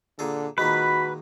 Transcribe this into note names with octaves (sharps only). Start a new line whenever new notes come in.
A#2 D3 G#4 A4
A#2 D#3 G#3 F#4 B4 B5